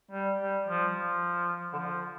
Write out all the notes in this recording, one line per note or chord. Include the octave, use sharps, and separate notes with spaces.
G3
G3
F3
F3
D3
F3